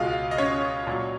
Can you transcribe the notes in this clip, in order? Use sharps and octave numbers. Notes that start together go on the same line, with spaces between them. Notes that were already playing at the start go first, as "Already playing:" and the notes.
Already playing: C#2 B2 G#3 F4 F5
D#5
C#4 C#5
A#2 F#3